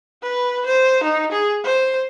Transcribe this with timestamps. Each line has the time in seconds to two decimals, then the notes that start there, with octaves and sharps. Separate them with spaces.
0.22 B4
0.66 C5
1.03 D#4
1.32 G#4
1.64 C5